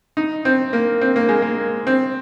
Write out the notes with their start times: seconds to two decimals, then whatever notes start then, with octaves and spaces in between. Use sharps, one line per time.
0.17 D#4
0.45 C4
0.73 A#3
1.01 C4
1.16 A#3
1.29 G#3
1.42 A#3
1.87 C4